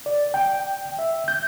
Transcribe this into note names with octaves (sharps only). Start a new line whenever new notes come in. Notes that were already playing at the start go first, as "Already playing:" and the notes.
D5
G5
E5
G6